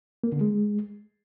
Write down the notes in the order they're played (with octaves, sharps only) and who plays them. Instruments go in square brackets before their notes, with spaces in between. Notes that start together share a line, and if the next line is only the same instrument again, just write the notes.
[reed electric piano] A#3
D3
G#3